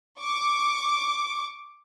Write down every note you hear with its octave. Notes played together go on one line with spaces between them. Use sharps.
C#6 D6